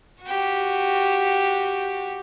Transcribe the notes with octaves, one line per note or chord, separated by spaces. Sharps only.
F#4 G4